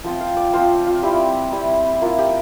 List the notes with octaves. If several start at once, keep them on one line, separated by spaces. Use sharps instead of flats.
F3 C4 F4 G5
F5
D5
F3 C4 F4 C5
F4
G3 C4 E4 G4
G3 C4 E4
A#3 E4 F4
G4